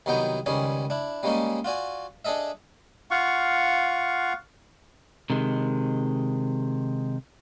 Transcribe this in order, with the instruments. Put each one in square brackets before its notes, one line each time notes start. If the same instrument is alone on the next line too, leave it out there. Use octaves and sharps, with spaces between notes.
[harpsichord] C2 D#3 F#3 B3 D#4 G5
C#2 D#3 G3 C#4 G#4
D4 E4
G3 G#3 A#3 C#4 D#4
F4 F#4 D5 G#5
D4 G#4 A4 D#5 E5
[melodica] F4 F5 F#5 C#6
[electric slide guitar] C3 D#3 G#3